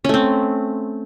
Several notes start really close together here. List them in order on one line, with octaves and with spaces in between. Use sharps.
C#4 A3 C4